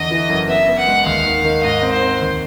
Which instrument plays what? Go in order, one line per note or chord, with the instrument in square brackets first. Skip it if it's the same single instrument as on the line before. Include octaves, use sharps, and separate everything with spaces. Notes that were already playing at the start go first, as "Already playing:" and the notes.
Already playing: [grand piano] E2 D3 [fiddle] D#5
[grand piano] E3
F#1
[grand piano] B3 [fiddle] E5
[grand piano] B3
[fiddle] F#5
[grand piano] G#3
[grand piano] D#2 [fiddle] F5
[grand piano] D#3
D#3
[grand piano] G#2 [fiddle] D#5
[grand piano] C4
[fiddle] C5
[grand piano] C4
D#2